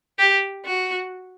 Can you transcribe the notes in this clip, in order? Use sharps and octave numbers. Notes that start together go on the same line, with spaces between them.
G4
F#4